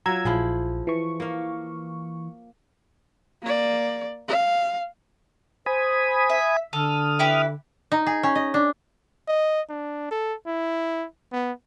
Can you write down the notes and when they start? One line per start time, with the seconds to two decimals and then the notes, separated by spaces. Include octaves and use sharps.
0.06 F#3 F4 A#5 E6 G#6
0.25 A#1 F3 E4 G#4
0.87 E3 C#6
1.20 A#3 F5
3.43 A#3 D5
4.28 F5
5.66 C5 G#5 B5 D#6
6.30 E5
6.73 D3 A4 D#6 F6
7.19 E4 G4 B4
7.92 D#4
8.06 G#4
8.23 C#4
8.35 D#5
8.54 D4
9.28 D#5
9.69 D4
10.11 A4
10.47 E4
11.32 B3